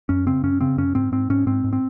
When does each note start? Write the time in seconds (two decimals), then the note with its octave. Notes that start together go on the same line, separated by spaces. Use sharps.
0.09 F#2 C#4
0.26 C#3 C4
0.44 F#2 C#4
0.61 C#3 C4
0.78 F#2 C#4
0.95 G#2 C4
1.12 G#2 C4
1.30 G#2 C#4
1.47 G#2 C4
1.64 G#2
1.73 C4